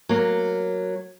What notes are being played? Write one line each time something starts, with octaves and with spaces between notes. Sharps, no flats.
F#3 A#3